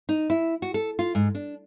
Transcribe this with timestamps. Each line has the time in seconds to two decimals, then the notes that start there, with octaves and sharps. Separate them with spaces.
0.09 D#4
0.30 E4
0.62 F#4
0.74 A4
0.99 F4
1.15 G#2
1.35 D4